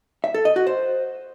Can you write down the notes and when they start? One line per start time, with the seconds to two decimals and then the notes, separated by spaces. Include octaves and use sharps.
0.24 E5
0.34 A4
0.45 D#5
0.56 F#4
0.67 C5